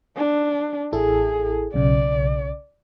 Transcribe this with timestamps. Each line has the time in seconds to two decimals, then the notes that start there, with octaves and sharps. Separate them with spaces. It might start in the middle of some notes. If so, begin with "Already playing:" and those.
0.16 D4
0.93 A1 E4 G#4 A4
1.74 B1 C#3 D5